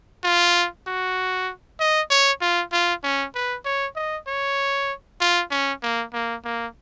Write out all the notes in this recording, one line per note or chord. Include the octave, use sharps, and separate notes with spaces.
F4
F#4
D#5
C#5
F4
F4
C#4
B4
C#5
D#5
C#5
F4
C#4
A#3
A#3
A#3